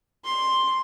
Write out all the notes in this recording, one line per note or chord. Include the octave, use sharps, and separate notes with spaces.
C6